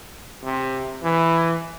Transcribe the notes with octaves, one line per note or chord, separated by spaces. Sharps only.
C3
E3